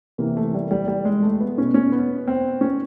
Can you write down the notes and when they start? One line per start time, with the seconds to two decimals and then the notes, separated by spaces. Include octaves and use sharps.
0.18 C3 E3 A#3
0.37 A3
0.54 G3
0.71 G3
0.88 G3
1.05 G#3
1.23 A3
1.40 B3
1.58 B2 C#4
1.74 C#4
1.92 B3
2.28 C4
2.61 C#4